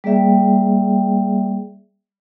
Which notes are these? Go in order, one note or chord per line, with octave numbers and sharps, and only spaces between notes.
G3 A#3 G#4 D5 E5 G5